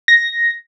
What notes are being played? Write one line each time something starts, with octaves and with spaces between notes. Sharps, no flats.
A#6